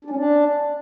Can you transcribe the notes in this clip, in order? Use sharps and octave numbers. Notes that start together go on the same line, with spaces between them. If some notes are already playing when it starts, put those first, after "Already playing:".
D4
C#4
D4